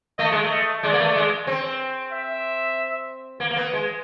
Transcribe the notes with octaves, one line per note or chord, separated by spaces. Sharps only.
A3 D#5
G#3
A3
D#5
G#3 D5
A#3
A3
G#3
C4
E5
A#3
A#3
B3
G#3